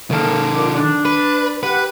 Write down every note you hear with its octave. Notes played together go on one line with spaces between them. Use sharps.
D#3 A#3 A4
A#2 D6
D4
B4
G4 B4 F#5